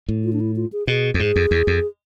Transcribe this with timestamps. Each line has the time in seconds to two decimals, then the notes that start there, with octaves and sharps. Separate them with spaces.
0.09 A2
0.24 F4
0.33 D4
0.40 E4
0.56 F4
0.73 G#4
0.87 B2 G#4
1.14 F2
1.19 G#2 G#4
1.36 F2
1.51 E2
1.67 F2